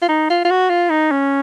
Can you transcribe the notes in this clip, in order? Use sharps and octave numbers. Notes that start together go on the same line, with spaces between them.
F4
D#4
F4
F4
F#4
F4
D#4
C#4